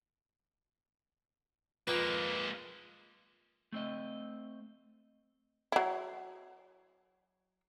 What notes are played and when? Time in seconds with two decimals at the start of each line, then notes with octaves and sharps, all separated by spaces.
1.87 F2 G#3 A#3 D#4 B4
3.72 A3 C4 D#5
5.72 F#3 E4